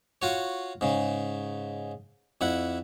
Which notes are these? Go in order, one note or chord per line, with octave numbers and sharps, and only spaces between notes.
F4 F#4 C#5
G#2 C#3
F2 E4 F#5